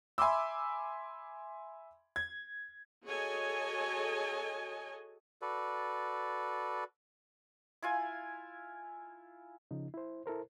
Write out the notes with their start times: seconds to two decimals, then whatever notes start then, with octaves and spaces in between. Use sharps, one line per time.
0.18 E5 G#5 B5 C6 D6 E6
2.16 G#6
3.06 F#4 G#4 A4 C#5 D#5 G#5
5.42 F#4 A4 B4 D5
7.82 E4 F4 G#5
9.71 C#3 F3 D#4
9.94 E4 C5
10.26 E4 A4 A#4 C5